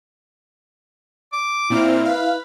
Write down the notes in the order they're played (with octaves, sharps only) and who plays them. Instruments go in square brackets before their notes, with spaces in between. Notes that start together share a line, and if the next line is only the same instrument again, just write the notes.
[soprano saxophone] D6
[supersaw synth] A#2 C4 F6 [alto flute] E4
[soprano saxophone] B4 [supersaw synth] F5